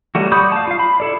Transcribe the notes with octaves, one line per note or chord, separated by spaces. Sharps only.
F#3 G3 A3 F#4
D5 B5 C#6 D#6 G6
F5 A5
F4 F5
B5
E4 A4 D5